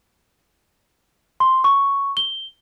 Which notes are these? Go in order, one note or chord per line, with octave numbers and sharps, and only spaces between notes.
C6
C#6
G7